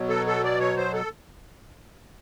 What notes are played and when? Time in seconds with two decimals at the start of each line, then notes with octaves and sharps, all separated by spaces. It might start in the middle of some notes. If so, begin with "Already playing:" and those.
Already playing: B2 F#3
0.09 A4
0.27 A4
0.44 D5
0.60 C#5
0.77 C5
0.94 A4